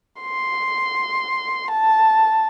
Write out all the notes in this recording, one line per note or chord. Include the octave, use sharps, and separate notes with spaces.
C6
A5